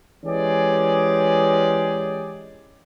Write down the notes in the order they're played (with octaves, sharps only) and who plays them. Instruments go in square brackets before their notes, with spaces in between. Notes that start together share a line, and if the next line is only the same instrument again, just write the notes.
[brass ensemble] E3 G#3 C#4 G4 G#4 D5